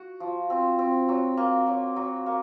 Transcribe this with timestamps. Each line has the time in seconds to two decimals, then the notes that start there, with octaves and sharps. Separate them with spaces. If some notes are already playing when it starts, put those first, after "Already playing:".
Already playing: F#4
0.20 F3
0.50 C4
0.79 C4
1.09 F#3
1.37 A#3
1.67 F#3
1.96 F#3
2.26 A#3